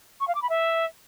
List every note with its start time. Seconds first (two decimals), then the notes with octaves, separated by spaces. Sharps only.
0.20 C#6
0.27 F5
0.35 D6
0.42 B5
0.49 E5